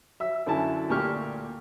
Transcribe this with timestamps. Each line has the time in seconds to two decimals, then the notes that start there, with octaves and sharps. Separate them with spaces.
0.20 E5 E6
0.46 F#2 D3 E4 G#5 A5
0.89 D2 A#2 G4 D5 C#6 F6